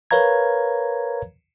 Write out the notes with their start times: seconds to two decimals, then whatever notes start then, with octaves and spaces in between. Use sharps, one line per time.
0.11 A#4 B4 C#5 F5 A#5 G#6